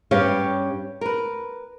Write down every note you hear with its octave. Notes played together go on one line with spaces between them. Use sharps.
G2 C#4 G4 B4 C#5 F5
A#4 B4